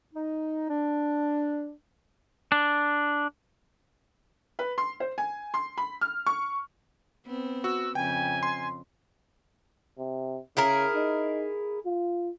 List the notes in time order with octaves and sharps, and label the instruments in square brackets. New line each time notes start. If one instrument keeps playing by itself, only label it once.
[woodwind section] D#4
D4
[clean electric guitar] D4
[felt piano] B4
C6
C5
G#5
C6
B5
F6
C#6
[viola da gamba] B3 C4
[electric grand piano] F#4 [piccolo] E6
[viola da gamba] F2 C#3 [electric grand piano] G5 [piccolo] G#5
[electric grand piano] C6
[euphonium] C3
[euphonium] C#3 [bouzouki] E4 G#4 A#4
[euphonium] D#4
F4